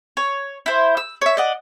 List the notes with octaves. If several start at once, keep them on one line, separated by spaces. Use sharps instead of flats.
C#5
E4 C5
E6
C#5 E5
D5 D#5 F#5